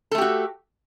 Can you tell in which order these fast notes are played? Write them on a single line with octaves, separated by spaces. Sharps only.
A4 A3 G4 F#4